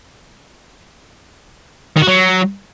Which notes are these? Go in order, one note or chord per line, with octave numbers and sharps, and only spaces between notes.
D#3
F#4
F#3